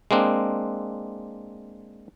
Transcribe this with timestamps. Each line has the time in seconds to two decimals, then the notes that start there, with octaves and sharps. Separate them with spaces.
0.11 G#3 A#3 C4 D4